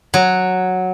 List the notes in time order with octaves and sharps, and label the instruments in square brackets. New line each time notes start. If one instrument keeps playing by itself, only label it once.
[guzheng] F#3